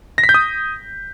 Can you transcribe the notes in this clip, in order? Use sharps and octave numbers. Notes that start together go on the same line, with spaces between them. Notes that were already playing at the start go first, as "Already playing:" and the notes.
A#6
B6
G6
D#6